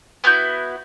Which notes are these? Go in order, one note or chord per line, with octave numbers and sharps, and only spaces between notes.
B3 E4 F#4 G6